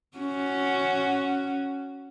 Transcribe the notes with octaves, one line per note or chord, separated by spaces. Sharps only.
C#4 F#4